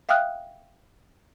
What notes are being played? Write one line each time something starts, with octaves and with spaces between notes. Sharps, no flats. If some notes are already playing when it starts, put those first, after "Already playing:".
E5 F5 G5 D#6 F6 F#6